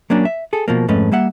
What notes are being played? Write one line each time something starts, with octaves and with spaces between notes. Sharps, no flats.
F#3 A#3 C#4 D4
E5
G#4 A4
B2 F3 A#3
F2 G#2 A3 C#4 B4
G3 A#3 E5 F#5